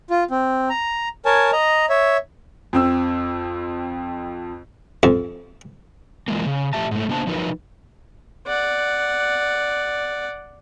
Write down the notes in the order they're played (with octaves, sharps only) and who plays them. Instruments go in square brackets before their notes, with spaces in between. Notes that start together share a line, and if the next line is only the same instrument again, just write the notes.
[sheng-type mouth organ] F4
C4
A#5
A#4 C#5 G#5 A5
D#5 A#5
C#5 E5
[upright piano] F2 C4 E6
[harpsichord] F2
[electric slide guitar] E3 F3 G#3 A#3
C#3
F2 A2 C3 G4 E5 A5
G#2 A3
C#3 A#3 B3 D4 C5 A5
F3 F#3 D#4 A#4 B4
[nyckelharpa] D5 F#5